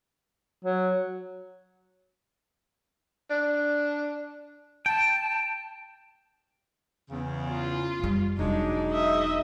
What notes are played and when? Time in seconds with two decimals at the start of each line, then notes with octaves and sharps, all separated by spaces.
0.64 F#3
3.30 D4
4.86 G5 A5
7.10 E2 C#3
7.50 F4
8.00 F#2 G3
8.39 E1 F#3 G#3 D4 D#4
8.92 D#5 E5